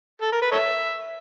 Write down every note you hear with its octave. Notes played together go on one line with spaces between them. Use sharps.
A4
A#4
B4
A4 C#5 E5